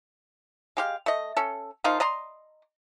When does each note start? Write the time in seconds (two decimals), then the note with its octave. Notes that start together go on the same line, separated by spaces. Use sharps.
0.77 G#3 G4 F5
1.06 A3 D#5
1.37 C#4 A4
1.84 F3 A#3 D#4 F4
2.00 D5 D#5 A#5 C6